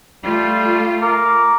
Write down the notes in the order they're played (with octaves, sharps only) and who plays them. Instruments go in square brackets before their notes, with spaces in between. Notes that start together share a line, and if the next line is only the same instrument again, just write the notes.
[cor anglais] G3 [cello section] A3 F4
[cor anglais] A#4 [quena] D6